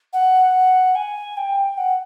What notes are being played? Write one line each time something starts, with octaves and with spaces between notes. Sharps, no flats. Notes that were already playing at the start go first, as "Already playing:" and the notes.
F#5
G#5
G5
F#5